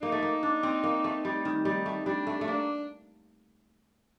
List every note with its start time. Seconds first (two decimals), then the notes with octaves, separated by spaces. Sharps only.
0.02 A#3 D#4
0.12 A3
0.22 A#3
0.43 D4
0.63 C4
0.83 A#3
1.04 A3
1.25 G3
1.45 D#3
1.65 G3 D#4
1.86 A3
2.06 G3 D4
2.27 A3
2.41 A3
2.47 A#3 D4